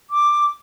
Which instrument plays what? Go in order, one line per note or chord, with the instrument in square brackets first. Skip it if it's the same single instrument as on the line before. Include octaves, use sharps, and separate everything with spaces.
[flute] D6